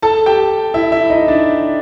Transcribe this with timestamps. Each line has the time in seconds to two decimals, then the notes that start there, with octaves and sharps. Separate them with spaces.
0.02 A4 A5
0.26 G4 G5
0.74 E4 E5
0.92 E4 E5
1.10 D#4 D#5
1.28 D4 D5